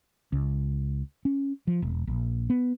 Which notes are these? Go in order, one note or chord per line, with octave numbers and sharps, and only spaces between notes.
C#2
C#4
F3
E1
A#1
B3